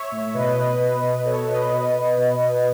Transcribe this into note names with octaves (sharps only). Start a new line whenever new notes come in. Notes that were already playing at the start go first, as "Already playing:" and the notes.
Already playing: C#5 E5
A2
B2 B4 D#5
B2
B2
B2
B2 A4 C#5
B2 B4 D#5
B2
B2
B2
B2